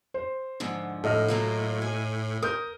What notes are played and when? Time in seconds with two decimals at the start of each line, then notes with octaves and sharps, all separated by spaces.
0.14 C5
0.60 G#2 D3 F3
1.04 A2 A4 D#5 F6
1.28 F#3 A#3 F4
1.82 G#5
2.43 A#4 D#6 G6